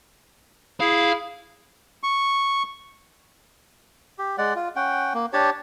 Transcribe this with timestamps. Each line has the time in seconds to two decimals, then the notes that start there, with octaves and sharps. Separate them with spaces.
0.80 E4 G#4 F5
2.03 C#6
4.19 G4
4.38 G#3 D5 F#5
4.55 F4
4.76 C#4 F#5 G5
5.14 A#3
5.33 D4 G4 C#5 A5